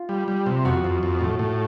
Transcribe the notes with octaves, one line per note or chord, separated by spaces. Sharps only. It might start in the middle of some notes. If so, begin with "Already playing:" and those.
Already playing: F4
G3
G3
C3
F2 F#4
F2
F2
A2
A2